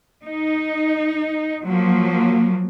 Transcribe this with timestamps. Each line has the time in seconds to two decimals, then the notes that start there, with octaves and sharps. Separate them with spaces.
0.25 D#4
1.65 F3 F#3 A#3